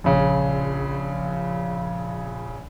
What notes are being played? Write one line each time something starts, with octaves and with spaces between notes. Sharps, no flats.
A#1 C#3